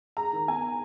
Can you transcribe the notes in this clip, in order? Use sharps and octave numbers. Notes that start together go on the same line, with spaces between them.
G#3 A#5
D#3
B3 G#5